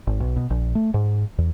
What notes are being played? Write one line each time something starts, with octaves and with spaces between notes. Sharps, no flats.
G#1
B1
B2
A#1
A3
G#2
E2